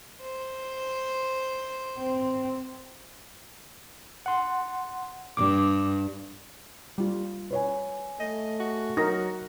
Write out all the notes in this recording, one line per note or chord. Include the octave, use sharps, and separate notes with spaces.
C5
C4
F#5 C6
G2 D6
G3 F4
B4 C#5 G#5
A3 D#5
F#4
F#3 D#4 A#4 D#6 A#6